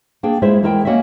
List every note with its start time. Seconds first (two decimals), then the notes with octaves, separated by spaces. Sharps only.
0.23 A#3 D4 G#4 G5
0.42 G#3 E4 F4 G#4 C5 E5
0.63 E2 G#3 E4 A#4 F5 G5
0.85 A#3 C#4 F#4 C#5 D#5 E5